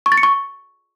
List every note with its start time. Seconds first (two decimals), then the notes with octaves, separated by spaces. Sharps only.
0.06 C#6
0.12 A6
0.18 C#7
0.23 C#6